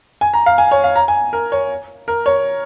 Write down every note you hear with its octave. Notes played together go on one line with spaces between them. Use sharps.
G#5
A#5
F5
G#5
C#5
F5
A#5
G#5
A#4
C#5
A#4
C#5